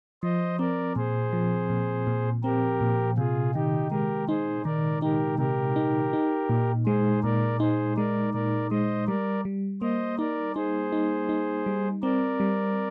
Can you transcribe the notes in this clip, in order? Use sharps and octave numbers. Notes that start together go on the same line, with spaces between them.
F3 C5 D#5
C4 A#4 D5
A#2 G#4 C5
F3
A#2
A#2
C4 G4 A#4
A#2
C3 F4 G#4
D#3 D#4 G4
G#3 G4 A#4
D#4 G#4 C5
D#3 A#4 D5
D#4 G4 A#4
C3 G4 A#4
D#4
D#4
A#2
G#3 G#4 C5
A#2 A#4 D5
D#4 G#4 C5
G#3 A#4 D5
A#2 A#4 D5
G#3 C5 D#5
G3 A#4 D5
G3
A#3 C5 D#5
D#4 A#4 D5
D#4 G#4 C5
D#4
D#4
G3
C4 A#4 D5
G3